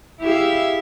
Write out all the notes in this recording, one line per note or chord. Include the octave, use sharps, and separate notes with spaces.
E4 G4 G#4 E5 F5